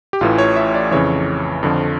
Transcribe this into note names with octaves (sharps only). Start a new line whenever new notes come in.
G4
A1 A2 E3 F4
C#5
E5
D5
F2 C#3 E3 C#5
F2 D3 F3